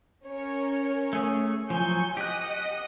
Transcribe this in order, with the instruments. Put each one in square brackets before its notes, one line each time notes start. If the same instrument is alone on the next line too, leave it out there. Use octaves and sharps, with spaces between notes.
[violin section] C#4 A#4 C#5
[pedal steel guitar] A3 G#4
[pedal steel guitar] F3 F#3 [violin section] G#5 C#6 G6
[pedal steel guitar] G4 F#6 [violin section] D#5 F#5 D#6